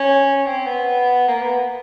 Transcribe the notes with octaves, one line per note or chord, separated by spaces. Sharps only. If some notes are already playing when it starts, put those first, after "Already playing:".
Already playing: C#4
C4
B3
A#3
B3